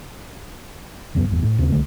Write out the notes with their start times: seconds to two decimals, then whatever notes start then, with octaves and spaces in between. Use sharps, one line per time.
1.15 E1 C#2 F#2 B3
1.28 G1 E2
1.42 A2
1.59 D#2 C#3 C4
1.72 C2 D3 A3